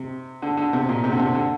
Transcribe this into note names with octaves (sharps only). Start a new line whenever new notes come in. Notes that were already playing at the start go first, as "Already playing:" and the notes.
Already playing: C3
D3
D3
C3
A#2
C3
D3
C3
D3